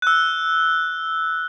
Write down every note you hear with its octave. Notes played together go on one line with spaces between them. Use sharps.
E6 F#6